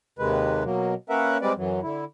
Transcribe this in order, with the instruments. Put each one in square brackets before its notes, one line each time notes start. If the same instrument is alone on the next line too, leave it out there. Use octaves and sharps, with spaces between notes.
[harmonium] D#2 C3 D#3 G#3 B4
B2 F#3 A#3
A#3 C#4 A#4 B4 E5 F#5
G3 G#3 C4 B4 D5
F#2 E3 F#3
D3 E4